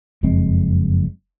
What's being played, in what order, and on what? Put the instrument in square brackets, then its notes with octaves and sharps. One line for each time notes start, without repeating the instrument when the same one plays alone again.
[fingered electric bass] F#1 F2 G#3 C4